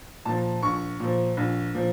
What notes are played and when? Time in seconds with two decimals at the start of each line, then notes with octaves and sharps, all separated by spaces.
0.25 A#2 F3 A5
0.63 A#1 C#6
1.00 A#2 F3
1.37 A#1
1.74 A#2 F3